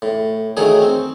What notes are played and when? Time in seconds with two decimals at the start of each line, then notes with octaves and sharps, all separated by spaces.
0.02 A2
0.57 D#3 F#3 A3 G#4
0.82 C4